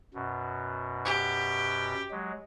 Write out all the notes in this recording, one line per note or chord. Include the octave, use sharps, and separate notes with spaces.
F#2 B2
G4
F#3 G#3